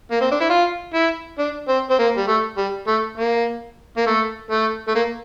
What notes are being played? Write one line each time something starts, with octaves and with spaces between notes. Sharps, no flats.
A#3
C4
D4
E4
F4
E4
D4
C4
C4
A#3
G3
A3
G3
A3
A#3
A#3
A3
A3
A3
A#3